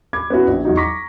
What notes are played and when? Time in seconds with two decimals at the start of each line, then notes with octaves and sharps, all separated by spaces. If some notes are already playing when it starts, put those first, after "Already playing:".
0.13 B5 D6 G#6
0.30 B3 C#4 E4 F#4
0.47 A#1
0.65 E2 F#3 D#4
0.77 A#5 C#6 D6 A#6 B6